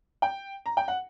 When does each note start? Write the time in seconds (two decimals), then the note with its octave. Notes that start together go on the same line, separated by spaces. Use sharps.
0.22 G5
0.66 A#5
0.77 G5
0.88 F#5